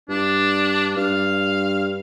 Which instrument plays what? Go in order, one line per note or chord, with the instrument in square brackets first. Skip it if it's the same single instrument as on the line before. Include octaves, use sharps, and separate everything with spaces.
[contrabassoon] G2 [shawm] D4
[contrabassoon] G2 [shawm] F5